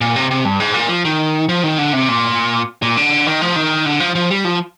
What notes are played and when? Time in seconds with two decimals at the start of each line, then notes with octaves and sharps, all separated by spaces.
0.01 A#2
0.16 C3
0.31 C3
0.45 G2
0.60 G#2
0.74 A#2
0.89 F3
1.05 D#3
1.49 F3
1.64 D#3
1.78 D3
1.93 C3
2.09 A#2
2.82 A#2
2.97 D3
3.27 D#3
3.42 F3
3.56 D#3
3.86 D3
4.00 F3
4.15 F3
4.31 G3
4.45 F3